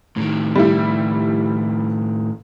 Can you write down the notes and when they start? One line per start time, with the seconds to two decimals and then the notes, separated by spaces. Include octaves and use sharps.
0.17 A2 D#3
0.55 G3 E4